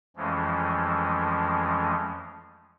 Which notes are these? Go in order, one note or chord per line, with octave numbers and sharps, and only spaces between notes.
F2 E3 F3 G#3 A3 C#4